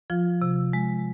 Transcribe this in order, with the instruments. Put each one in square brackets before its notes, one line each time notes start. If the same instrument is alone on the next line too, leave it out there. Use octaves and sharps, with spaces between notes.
[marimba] F3 F4
C3
G#3